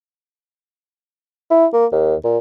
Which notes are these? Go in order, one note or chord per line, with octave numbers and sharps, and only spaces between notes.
E4
A#3
D#2
A#2